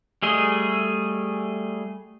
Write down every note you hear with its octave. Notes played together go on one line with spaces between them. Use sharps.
G3 A3 G#4 D#5